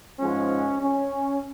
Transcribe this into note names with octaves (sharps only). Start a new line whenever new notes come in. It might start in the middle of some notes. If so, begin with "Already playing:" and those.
G#2 F3 G#3 C#4
C#4